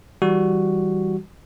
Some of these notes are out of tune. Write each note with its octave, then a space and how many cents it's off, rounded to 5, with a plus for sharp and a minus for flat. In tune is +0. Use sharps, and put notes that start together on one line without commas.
E3 +0 G3 +0 F#4 +0